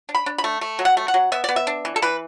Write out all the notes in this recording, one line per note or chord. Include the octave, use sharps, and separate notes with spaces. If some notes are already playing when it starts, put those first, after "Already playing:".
D4
B5
D4
B5
A3
A3
F#3
F#5
A3
F#5
F#3
B3 E5
B3 D5
E5
D4
E3
A4
E3 B4